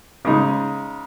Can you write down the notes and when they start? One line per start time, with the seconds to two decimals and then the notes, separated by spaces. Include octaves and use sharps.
0.25 C#3 G#3 D#4